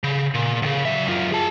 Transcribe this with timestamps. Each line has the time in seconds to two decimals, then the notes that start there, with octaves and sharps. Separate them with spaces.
0.04 C#3
0.35 A#2
0.62 C2 C#3
0.85 F#3 E5
1.07 F#2 F4
1.32 G#4 A5